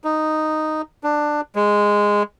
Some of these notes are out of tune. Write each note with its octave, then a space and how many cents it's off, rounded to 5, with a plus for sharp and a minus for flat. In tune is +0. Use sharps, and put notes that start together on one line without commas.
D#4 -5
D4 +15
G#3 -10